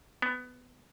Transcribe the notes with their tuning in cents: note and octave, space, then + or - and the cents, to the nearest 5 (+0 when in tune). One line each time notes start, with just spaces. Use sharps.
B3 +15